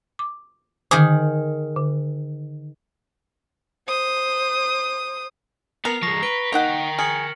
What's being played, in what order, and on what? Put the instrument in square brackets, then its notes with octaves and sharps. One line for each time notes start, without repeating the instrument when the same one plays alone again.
[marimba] D6
[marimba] D3 [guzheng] D#3 G#4
[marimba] D3
[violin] C5 D#6
[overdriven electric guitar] B3 [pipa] A#4 [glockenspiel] A#5 C7 F7
[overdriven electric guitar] F3 G#3 [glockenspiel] C#6 A#6
[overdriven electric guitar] B4 [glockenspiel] B6 D7 G7
[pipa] A#3 D#4 F#5 [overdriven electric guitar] A#4 G5
[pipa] G#4 [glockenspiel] F6 C#7 F#7